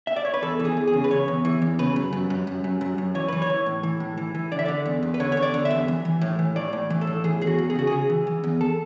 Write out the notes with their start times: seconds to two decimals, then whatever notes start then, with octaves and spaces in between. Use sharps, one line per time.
0.07 E5
0.16 D5
0.25 C#5
0.34 B4
0.42 E2 A4
0.60 E3
0.65 G#4
0.77 E2
0.87 G#4
0.93 C#3
1.04 B4
1.11 C#3 C#5
1.28 E2
1.45 E3
1.62 E2
1.79 C#3 B4
1.96 F#2
2.13 F#2
2.30 F#2
2.47 F#2
2.64 F#2
2.81 F#2
2.98 F#2
3.15 E3 C#5
3.28 E3 B4
3.42 C#5
3.50 E3
3.66 A2
3.83 E3
4.00 A2
4.17 E3
4.35 E3
4.52 D3 D5
4.59 E5
4.66 D3 D5
4.86 E2
5.03 E2
5.14 B4
5.20 D3 C#5
5.32 C#5
5.37 E2
5.43 D5
5.54 D3
5.65 E5
5.71 E2
5.88 E3
6.05 E3
6.22 A2
6.39 E3
6.56 A2 D5
6.73 A2
6.90 E3
7.01 A4
7.07 A2
7.24 E3 G#4
7.41 E2 G#4
7.47 F#4
7.58 E2
7.70 G#4
7.75 C#3 F#4
7.87 G#4
7.92 C#3
8.10 E3
8.27 E3
8.44 E2
8.61 A4